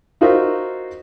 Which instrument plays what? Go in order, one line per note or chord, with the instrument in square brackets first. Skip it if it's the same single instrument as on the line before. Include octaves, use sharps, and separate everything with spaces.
[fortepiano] D#4 F4 F#4 A#4 C5 E5